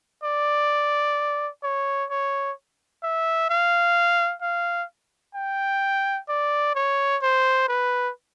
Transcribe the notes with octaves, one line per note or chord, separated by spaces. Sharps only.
D5
C#5
C#5
E5
F5
F5
G5
D5
C#5
C5
B4